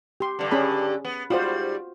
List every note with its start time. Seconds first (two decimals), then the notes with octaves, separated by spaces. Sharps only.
0.20 G4 C6
0.39 G2 D3
0.51 C#4 G#4 B5
1.05 B3
1.30 G#2 G3 F4 F#4 C5